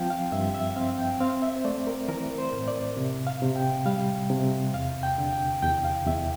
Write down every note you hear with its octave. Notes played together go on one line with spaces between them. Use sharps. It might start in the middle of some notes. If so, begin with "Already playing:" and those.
Already playing: F3 C4 F5 G5
F5
G2 E5
E5
C4 F5
G5
C4 F5
E5
C5
A3 D5
A#4
E3 A#4
C5
A2
D5
C3
F5
C3
G5
G3 F5
C3
E2 F5
G5
D3
G5
E2 G5
F5
E2 E5